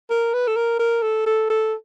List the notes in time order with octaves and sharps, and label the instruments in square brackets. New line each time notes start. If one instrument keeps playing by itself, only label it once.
[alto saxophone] A#4
B4
A4
A#4
A#4
A4
A4
A4